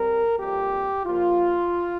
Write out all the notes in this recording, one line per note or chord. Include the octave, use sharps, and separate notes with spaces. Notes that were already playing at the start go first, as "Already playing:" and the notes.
Already playing: G3 C4 A#4
F2 C3 G3 A#3 G4
A#2 F3 A#3 F4